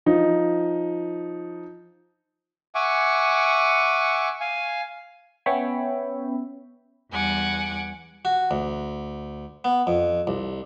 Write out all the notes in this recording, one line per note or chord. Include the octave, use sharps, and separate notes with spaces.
F3 D#4
E5 F#5 G#5 C#6 D6
F5 G#5
B3 C#4 C#5 E5 G5 B5
E2 G3 F#5 G#5 D6
F#4
D2
B3
F2
C2